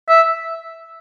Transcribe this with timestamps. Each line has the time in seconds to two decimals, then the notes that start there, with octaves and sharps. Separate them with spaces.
0.09 E5